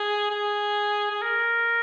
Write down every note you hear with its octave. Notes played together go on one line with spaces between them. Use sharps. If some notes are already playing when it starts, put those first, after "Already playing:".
Already playing: G#4
G#4
G#4
A#4